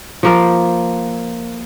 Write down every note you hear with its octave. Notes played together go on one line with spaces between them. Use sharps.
F3 A#3 A#4